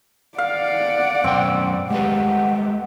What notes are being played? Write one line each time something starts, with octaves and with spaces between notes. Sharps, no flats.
D5 F5 F#5
F#2 B2 C4 G5
G#3 A3 G4 B4 F#5